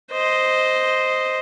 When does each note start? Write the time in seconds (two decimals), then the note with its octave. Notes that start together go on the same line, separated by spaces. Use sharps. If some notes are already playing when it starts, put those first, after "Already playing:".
0.12 C5 D#5